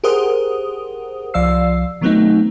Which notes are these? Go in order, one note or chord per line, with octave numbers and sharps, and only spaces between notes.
G4 G#4 A#4 C5 F#5 D#6
C2 F3 D5 F5 E6 C7
D#3 F#3 A3 B3 C4 D#4